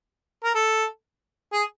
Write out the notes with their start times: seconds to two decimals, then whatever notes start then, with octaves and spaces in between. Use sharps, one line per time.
0.44 A#4
0.55 A4
1.53 G#4